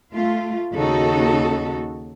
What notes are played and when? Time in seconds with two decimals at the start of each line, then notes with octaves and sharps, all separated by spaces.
0.12 A3 F4
0.72 D#2 C#3 D#4 F#4 A4